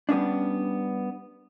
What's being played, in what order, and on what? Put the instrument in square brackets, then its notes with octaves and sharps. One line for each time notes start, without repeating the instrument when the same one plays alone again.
[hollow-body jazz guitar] G3 B3 C#4 D4